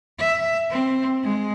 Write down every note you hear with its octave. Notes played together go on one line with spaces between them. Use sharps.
E5
C4
G#3